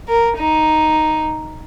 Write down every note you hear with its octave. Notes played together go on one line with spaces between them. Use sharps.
A#4
D#4